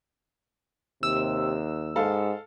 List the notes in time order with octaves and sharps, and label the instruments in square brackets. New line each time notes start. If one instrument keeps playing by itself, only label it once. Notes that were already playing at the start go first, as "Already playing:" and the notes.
[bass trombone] D#2 [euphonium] C3 [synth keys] E6
[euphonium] G#2 [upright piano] A4 F5